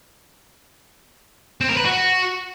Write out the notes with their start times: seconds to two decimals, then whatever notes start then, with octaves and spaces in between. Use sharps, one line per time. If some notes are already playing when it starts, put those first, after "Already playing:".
1.61 C4
1.69 A#4
1.77 B4
1.85 F#4